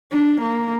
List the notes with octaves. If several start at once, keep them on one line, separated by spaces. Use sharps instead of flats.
D4
A#3